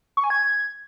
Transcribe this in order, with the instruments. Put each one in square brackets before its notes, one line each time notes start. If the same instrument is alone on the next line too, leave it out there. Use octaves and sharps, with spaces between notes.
[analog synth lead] C#6
G#5
G#6